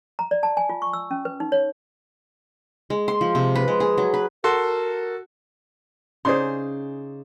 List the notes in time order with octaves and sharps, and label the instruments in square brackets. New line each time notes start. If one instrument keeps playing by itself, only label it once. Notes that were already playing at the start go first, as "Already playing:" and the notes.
[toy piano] A#5
D5
A5
G#5
F4
C#6
E6
C#4
B4
D#4
C#5
[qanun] G#3
C6
F3
C3
B4
G#3
G#4
F#3
B4
[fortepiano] F#4 A4 C6 [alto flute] A#4
[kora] C#3 D#4 G#4 [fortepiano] C5 D5 C6